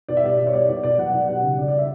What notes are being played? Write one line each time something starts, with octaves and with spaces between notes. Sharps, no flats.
B2 D5
E5
G3 D5
B2 D5
C#5
G3 D5
B2 D5
B2 D5
F#3 F#5
B2
G3 F#5
C#3
C#3 D5
D5
E5